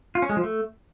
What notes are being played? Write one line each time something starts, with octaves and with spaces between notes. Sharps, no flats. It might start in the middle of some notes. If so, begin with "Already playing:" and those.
F4
C#4
G#3
F3
A3